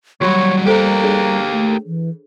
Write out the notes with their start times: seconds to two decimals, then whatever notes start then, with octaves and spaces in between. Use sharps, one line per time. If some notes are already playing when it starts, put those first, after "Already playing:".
0.21 D#2 F#3 G3 F#4 G4 C#5 B5
0.66 A#3 G4 A4 A#4 C5 G5
1.04 D4 G#4 C#5
1.51 A3
1.86 E3